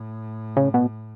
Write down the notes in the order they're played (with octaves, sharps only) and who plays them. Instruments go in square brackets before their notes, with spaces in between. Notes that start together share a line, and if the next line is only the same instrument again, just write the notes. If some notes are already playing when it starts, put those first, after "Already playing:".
Already playing: [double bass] A2
[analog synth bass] C#3
B2